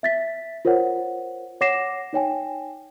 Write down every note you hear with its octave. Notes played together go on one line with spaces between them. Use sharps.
E5 A6 B6
F4 A#4 C5 C#5 F#5
C#5 F#5 D6 A#6 C7 E7
D#4 C#5 G5 G#5